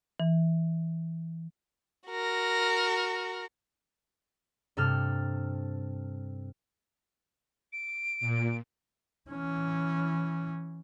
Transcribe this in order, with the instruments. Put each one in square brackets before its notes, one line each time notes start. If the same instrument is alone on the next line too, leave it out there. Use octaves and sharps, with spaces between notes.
[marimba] E3
[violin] F#4 A#4
[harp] G2 C3 A4 F6
[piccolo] D7
[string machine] A#2
[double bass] E3 C#4